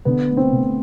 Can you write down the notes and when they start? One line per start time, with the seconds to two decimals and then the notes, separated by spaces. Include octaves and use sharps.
0.05 D3 B3
0.29 A3
0.37 C4
0.53 D3